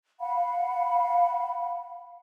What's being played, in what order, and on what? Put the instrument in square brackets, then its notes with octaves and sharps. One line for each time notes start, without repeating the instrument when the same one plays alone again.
[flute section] F5 F#5 B5